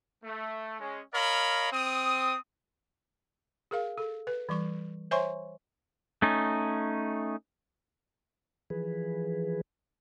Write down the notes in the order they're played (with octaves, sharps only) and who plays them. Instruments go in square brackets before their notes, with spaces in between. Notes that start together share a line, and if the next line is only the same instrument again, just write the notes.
[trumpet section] A3
G#3 C#4
A#4 C#5 D#5 F5 B5
C4 D#6
[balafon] G#4 A#4 F5
A4
B4
E3 G3 C#6
C5 C#5 E5 G#5 C6 C#6
[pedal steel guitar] A3 C#4 D#4
[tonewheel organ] E3 F3 G#4 B4